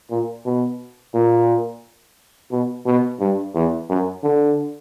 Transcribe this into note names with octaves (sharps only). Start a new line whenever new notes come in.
A#2
B2
A#2
B2
B2
G2
E2
F#2
D3